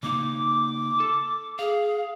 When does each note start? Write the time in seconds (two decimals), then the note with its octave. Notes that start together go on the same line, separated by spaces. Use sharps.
0.03 C#3 A#3 D#4 D6
1.00 A4
1.59 G#4 F5